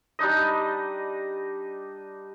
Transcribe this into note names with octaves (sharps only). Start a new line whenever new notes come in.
G3 D4 D#4 D#5